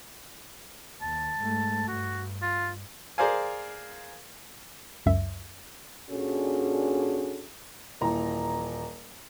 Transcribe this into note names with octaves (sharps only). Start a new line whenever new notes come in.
D#2 A5
G#2 A3
G2 F#4
F4
G#4 A#4 C5 D5 F5 G#5
C#2 F#2 E5
A#2 C#4 D4 F#4 G#4 A4
D#1 E3 A#5